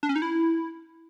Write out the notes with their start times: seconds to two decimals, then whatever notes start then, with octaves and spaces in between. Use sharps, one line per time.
0.03 D4
0.09 C#4
0.16 D#4
0.22 E4